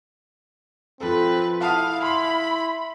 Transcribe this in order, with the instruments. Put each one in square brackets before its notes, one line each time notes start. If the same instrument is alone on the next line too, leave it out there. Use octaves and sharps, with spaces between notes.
[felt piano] F3 A4 [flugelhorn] C4 [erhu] B4
[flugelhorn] E4 [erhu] F5 [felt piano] F#5 A5 D#6
[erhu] B5 [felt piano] C6